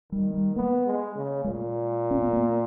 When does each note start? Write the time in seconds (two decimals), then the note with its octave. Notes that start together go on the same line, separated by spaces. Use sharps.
0.12 D#3 G3
0.34 G3
0.56 A#3 B3
0.86 G#3
1.15 C#3
1.44 A#2 G#3
2.11 C#4
2.22 B3
2.33 A#3